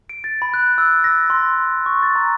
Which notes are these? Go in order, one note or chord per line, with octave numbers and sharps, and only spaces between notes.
D7
A6
B5
F#6
E6
A#6
C6
C#6
A6
A#5